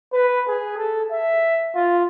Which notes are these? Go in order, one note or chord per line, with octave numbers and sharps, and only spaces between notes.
B4
G#4
A4
E5
F4